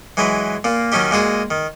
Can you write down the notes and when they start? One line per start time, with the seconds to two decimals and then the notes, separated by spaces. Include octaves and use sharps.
0.17 E3 F#3 G#3 B4
0.64 A#2 A#3
0.92 D#3 F#3 C#4 D#4 G4
1.11 A#2 G#3 F#4 G#4
1.50 D#3